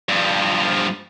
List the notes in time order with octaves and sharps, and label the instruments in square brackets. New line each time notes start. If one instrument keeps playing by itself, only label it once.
[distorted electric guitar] G2 F3